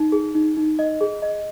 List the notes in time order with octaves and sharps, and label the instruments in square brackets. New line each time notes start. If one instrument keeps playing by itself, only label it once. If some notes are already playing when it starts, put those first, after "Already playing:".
Already playing: [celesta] D#4
G#4
D#4
D#4
D#5
G#4
D#5